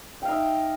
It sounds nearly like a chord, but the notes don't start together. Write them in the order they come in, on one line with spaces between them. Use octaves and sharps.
G5 F5 D#4 E5